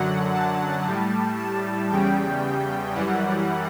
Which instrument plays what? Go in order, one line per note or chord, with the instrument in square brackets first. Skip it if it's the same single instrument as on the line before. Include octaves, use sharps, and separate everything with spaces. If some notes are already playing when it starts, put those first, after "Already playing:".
Already playing: [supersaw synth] F#2 D3 F#3 F#5
A5
A2 G3
A5
E2 C#3 G3 G5
F#2 E3 G3 F#5